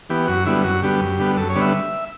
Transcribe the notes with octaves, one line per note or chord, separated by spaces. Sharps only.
E3 B3 G4
F#2 F#4
D3 G3 B3 E4
F#2 F#4
D3 G3 B3 G4
F#2
D3 G3 B3
F#2 A4
C#5
D3 G3 B3
E5